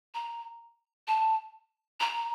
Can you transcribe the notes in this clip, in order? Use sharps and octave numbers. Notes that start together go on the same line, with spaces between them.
A#5
A5
A#5